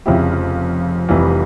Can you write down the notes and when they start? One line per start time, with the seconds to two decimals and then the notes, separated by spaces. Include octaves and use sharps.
0.06 F1 F2 C#3 E4 G4
0.31 F4
1.08 F1 F2 E3 G3 F4